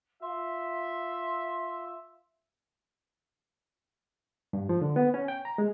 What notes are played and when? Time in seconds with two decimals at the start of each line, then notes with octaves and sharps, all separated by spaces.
0.22 F4 E5 C6
4.53 G2
4.69 F3
4.82 D3
4.96 B3
5.14 C#4
5.28 G5
5.45 A#5
5.58 G#3